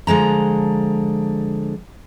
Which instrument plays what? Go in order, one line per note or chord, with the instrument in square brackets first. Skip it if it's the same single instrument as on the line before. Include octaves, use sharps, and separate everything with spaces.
[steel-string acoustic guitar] D3 F3 G#3 A#5